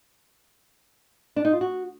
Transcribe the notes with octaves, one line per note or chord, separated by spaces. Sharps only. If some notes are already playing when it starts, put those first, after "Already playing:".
D4
D#4
F4
F#4